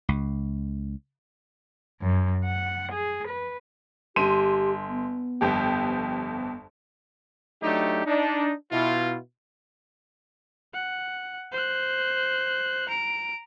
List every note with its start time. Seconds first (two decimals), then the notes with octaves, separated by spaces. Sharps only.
0.09 C#2
2.02 F#2
2.45 F#5
2.92 G#4
3.28 B4
4.16 G1 G4 C6 D#7
4.89 B3
5.41 G1 F2 G4
7.62 F#3 A3 D4 D#4 G4
8.06 D4 D#4
8.71 B2 E4 F4
10.73 F#5
11.52 C5 F#6
12.89 A#5 D7